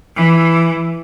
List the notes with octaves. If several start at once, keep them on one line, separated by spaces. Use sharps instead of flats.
E3